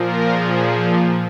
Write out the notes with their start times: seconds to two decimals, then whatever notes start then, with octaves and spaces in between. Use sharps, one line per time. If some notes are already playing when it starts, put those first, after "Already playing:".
Already playing: A#2 F3 A#4
0.27 G#4